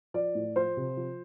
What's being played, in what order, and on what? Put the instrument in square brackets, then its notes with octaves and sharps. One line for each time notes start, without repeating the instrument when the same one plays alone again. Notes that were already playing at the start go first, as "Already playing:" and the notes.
[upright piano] F3 D5
A2
F3 C5
C3
F3